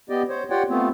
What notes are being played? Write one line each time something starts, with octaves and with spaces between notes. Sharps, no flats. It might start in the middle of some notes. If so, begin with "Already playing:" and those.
B3 G4 D5 D#5
C5 C#5
F4 G4 C#5 D5 F#5 G5
A3 B3 C4 F4